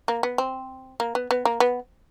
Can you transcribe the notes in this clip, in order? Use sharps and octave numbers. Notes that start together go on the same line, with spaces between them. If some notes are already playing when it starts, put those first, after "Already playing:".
A#3
B3
C4
A#3
B3
B3
A#3
B3